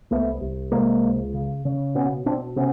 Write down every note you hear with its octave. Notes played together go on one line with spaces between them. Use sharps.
C2 A3 B3
C2
C3 G#3 A#3
C#2
C#3
C#3
B2 B3 C#4
B2 C4 D4
C3 B3 C#4